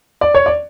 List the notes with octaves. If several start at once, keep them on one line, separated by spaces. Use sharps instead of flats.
D5
C#5
D5